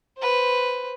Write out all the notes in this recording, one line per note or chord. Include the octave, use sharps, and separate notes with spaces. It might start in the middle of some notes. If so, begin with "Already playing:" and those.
B4 C5